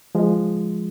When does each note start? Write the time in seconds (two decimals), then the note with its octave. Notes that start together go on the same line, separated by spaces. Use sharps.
0.15 F3 G#3